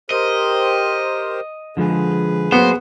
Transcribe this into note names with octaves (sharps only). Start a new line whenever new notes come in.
G4 A#4 C5 D#5
D3 F3 G#3 G#4 B4
F#3 A#3 B3 C5